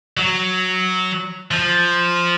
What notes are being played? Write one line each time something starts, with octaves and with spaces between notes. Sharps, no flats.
F#3
F3